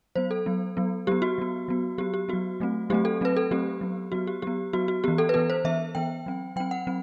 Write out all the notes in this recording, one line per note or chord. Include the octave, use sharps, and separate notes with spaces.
F#3 B3 C5
A4
F#3 B3
F#3 B3
F#3 B3 G4
F#4
F#3 B3
F#3 B3
F#3 B3 G4
G4
F#3 B3 F#4
F#3 A3 C4
F#3 A3 C4 G4
A4
F#3 A3 C4 B4
A4
F#3 A3 C4 G4
F#3 B3
F#3 B3 F#4
G4
F#3 B3 G4
F#3 B3 F#4
F#4
E3 B3 G4
A4
B4
E3 B3 A4
C5
E3 B3 E5
E3 B3 G5
F#3 C4
F#3 C4 G5
F#5
F#3 C4